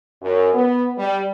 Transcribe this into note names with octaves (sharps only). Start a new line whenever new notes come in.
F#2
B3
G3